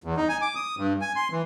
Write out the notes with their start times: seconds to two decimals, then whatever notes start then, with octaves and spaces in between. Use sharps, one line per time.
0.04 E2
0.17 D#4
0.29 G#5
0.42 D6
0.55 D#6
0.78 G2
1.01 G#5
1.16 C6
1.31 E3